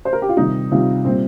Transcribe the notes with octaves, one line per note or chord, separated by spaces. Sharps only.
C5
A#4
G4
F4
C3 D#3 G3 D#4
C3 D#3 G3 F4
A#2 G3 C4